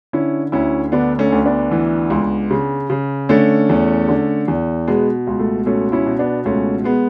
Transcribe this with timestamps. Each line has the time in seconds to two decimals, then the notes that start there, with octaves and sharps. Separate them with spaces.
0.13 D3 C#4 E4
0.52 D2 C#4 E4
0.92 D3 B3 D4
1.19 A3 C#4
1.32 D2
1.45 B3 D4
1.71 E3
2.10 C#2
2.51 C#3
2.90 C#3
3.29 D3 A3 C#4
3.69 E2
4.08 D3
4.48 E2
4.87 B2 G#3 B3
5.27 C#2
5.39 A3
5.66 B2 A3 C#4
5.92 C#4 E4
6.06 B2
6.19 B3 D4
6.45 C#2 A3 C#4
6.84 G#3 B3